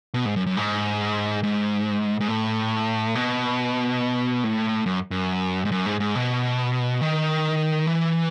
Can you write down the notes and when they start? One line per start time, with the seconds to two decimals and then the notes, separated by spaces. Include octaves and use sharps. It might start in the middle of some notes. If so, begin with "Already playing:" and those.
0.14 B2
0.26 G#2
0.36 F#2
0.47 F#2
0.57 G#2
1.43 G#2
2.20 G#2
2.28 A2
3.15 B2
4.44 A2
4.86 F#2
5.11 F#2
5.65 G#2
5.72 F#2
5.86 G#2
6.00 G#2
6.15 B2
7.01 D#3
7.87 E3